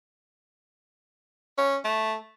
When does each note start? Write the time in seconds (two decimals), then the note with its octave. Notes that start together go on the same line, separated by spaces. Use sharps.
1.58 C#4
1.85 A3